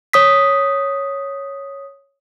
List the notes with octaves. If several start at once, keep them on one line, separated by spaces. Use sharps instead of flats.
C#5 D#6 B6